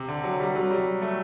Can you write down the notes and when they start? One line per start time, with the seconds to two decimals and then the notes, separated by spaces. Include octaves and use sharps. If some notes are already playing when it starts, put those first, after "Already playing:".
Already playing: C3
0.08 D3
0.24 F#3
0.40 G3
0.55 F#3
0.71 G3
1.02 A3